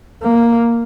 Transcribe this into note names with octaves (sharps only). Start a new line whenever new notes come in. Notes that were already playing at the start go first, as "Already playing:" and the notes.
A#3